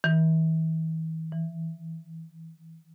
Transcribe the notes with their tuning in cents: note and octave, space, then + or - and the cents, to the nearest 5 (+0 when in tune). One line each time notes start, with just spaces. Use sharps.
E3 -40
E3 +0